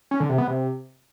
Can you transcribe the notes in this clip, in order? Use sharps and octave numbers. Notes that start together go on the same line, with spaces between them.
C#4
D3
C3
B3
C3